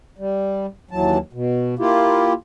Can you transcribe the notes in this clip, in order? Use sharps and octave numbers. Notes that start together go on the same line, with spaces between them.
G3
D#2 E3 F#3 A5
B2
A#3 E4 F4 G4